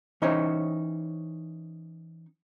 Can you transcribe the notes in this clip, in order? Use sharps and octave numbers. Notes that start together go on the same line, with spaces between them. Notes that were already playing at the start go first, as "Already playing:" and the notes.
E3 C#4 D#4 C5 C#5